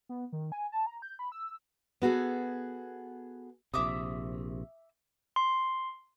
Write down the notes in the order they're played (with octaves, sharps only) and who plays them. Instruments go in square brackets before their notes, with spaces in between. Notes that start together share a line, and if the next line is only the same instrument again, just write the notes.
[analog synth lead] B3
D#3
G#5
A5
A#5
G6
B5
E6
[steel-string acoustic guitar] B3 F#4 G#4 A4
[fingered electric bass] A#1 C3 [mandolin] E5 D6 D#6
[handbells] C6